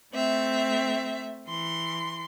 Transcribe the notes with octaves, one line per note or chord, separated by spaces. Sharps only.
A3 C4 E5
E3 C6